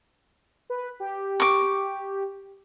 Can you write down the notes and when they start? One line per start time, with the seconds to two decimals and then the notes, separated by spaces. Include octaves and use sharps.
0.70 B4
1.00 G4
1.40 C#6 D6